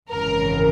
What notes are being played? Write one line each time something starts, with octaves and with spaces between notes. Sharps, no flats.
G#1 F#2 C#3 E3 A#4